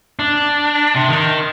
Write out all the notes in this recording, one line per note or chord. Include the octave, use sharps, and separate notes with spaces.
D4
C3
D#3